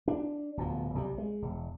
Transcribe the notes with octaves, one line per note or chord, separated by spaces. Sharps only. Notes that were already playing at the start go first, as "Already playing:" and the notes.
D4
D1 B2 F3
B1 C3 F3 G3
G#3
E1